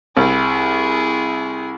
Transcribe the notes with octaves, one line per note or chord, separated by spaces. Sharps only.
C2 E4 G#4